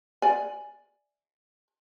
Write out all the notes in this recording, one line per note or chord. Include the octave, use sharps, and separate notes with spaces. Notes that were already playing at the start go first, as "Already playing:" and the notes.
D5 G#5